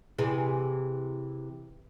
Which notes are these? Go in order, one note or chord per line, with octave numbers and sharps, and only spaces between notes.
C3 E3 G#4